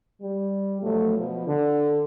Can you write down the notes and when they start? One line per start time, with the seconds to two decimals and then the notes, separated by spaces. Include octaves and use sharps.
0.22 G3
0.82 G2 B2 F3 F#3 A3
1.17 B2 F3
1.48 D3